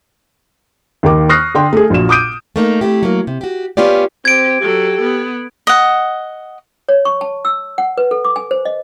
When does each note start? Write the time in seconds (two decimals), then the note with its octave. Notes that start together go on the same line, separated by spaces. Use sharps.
1.03 D#2 D#3 A#3 A#4 D6
1.29 C#6 D#6 F6 F#6 A#6 C7
1.54 D3 D4 G5 C6
1.73 A3 G#4
1.90 A#1 A#2 F#4 E7
2.09 D6 D#6 G6 D7 D#7
2.56 A3 A#3 D#4
2.81 A3 C4 E4 G4
3.03 F#3 A#3
3.27 C3
3.41 F#4 G4
3.77 B3 C#4 F4 G4 D5
4.25 C4 G4 G#6 D7
4.61 F#3 G4 A4
5.01 B3
5.67 D#5 F#5
6.89 C#5
7.05 C#6
7.21 A5
7.45 E6
7.78 F#5
7.98 B4
8.11 A4
8.25 D6
8.36 G#5
8.51 C5
8.65 D#5